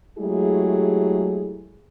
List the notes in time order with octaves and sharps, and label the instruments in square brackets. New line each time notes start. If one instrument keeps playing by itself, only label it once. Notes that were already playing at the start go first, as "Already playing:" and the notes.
[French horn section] F#3 G#3 A3 E4 G4 G#4